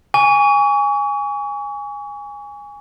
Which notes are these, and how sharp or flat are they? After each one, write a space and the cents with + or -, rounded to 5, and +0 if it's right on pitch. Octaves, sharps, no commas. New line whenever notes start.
G#5 -15 C#6 +35